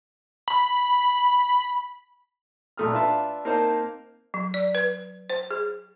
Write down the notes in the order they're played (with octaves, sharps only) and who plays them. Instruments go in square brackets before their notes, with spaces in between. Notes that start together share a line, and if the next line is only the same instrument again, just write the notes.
[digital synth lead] B5
[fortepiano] B1 A#2 A3 D#6 F6
D4 F4 B4 E5 F5 A5
A#3 C4 D#4 A#4 C5 A5
[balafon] F#3
D5
B4
C5
G#4